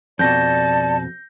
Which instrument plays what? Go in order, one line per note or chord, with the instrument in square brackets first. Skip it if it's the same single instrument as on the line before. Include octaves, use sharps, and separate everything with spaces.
[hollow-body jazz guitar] F2 B2 [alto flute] D5 [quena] A5 [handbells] G6 A#6